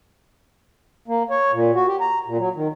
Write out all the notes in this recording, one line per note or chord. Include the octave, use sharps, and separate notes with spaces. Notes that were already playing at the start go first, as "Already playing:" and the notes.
A#3
C#5
A#2
F#4
G4
A#5
A#2
F#3
D#3